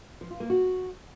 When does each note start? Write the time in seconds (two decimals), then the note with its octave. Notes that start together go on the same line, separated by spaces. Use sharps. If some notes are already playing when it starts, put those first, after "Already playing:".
0.21 F3
0.31 F4
0.40 A#3
0.50 F#4